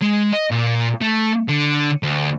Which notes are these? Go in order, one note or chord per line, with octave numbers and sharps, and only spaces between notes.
G#3
D#5
A#2
A3
D3
D2